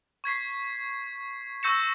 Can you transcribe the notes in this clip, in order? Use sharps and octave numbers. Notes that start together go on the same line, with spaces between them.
C#6 G#6 B6 C7
C#6 E6 G6 A#6 C#7 E7